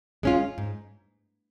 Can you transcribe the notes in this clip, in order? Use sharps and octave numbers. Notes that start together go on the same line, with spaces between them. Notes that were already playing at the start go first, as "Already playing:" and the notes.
G#3 C#4 F4
G#2